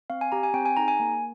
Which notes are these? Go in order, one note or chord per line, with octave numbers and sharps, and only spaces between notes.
C4 F5
G#5
G4 A#5
G#5
C4 G5
G#5
D#4 G#4 A#5
G#5
A#3